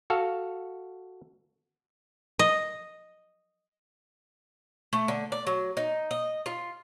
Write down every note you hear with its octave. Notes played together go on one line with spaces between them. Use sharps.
F#4 A4 F5
D#5
A3
D3
D5
F#3
D#4
D#5
F4